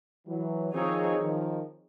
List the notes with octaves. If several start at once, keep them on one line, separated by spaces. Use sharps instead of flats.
E3 F#3
D#3 F3 C4 D#4 G#4 C#5
D#3 F3